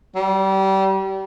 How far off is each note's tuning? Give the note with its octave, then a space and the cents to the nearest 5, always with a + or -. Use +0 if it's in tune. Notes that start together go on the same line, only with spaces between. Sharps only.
G3 -25